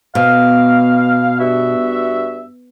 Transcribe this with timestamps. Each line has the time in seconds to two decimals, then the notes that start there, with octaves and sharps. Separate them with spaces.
0.15 B2 F5
1.40 G2 F#4 E5